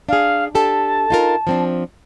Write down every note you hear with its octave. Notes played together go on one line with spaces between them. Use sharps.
D4 G#4 F5
D4 G4 A4 A5
D#4 F4 A#4
F3 C4 D4